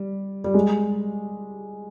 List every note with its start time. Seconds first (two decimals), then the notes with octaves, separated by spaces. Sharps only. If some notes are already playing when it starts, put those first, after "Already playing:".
Already playing: G3
0.44 G3
0.54 G#3